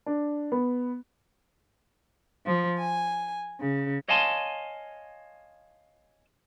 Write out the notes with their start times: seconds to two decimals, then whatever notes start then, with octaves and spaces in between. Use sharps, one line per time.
0.06 D4
0.52 B3
2.46 F3
2.79 G#5
3.60 C#3
4.08 C#5 D#5 F5 G#5 A5 C6